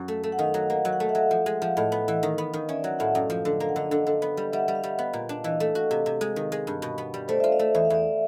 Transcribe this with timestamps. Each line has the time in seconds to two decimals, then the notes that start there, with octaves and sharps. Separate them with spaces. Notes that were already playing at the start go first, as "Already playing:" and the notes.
Already playing: F#2 F#4
0.08 A3
0.24 A3
0.32 F#5
0.38 D#3 D#5 F5
0.54 F#3
0.70 A#3
0.85 F#3
0.93 F#5
1.00 A3 F5
1.09 E5 F#5
1.15 F#3
1.31 F3
1.46 G#3
1.62 F3
1.77 A2 D#5 F5
1.92 B3
2.08 E3
2.23 D#3
2.38 B3
2.53 D#3
2.68 C#4 D5 E5
2.83 F#3 E5 F#5
2.99 A2 E5 F#5
3.14 F#2 D#5 F5
3.30 F3
3.45 D3
3.60 A#3 F5
3.69 F#5
3.76 D3 D#5 F5
3.91 D3
4.07 D3
4.22 B3
4.37 G3
4.53 G3 E5 F#5
4.68 G3
4.75 D#5 F5
4.84 G3
4.99 B3
5.13 A#2
5.29 D4
5.44 E3 D#5 F5
5.60 A3
5.75 F#4
5.91 C3
6.06 C3
6.21 G#3
6.36 D#3
6.52 G#3
6.67 G2
6.82 B2
6.98 B3
7.14 G3
7.28 A3 C5 D5
7.40 F4 E5
7.52 D#5 F5
7.59 A3
7.75 E2 E5
7.85 F5
7.90 E2 D5 E5